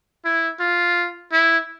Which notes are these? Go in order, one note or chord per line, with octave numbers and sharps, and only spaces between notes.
E4
F4
E4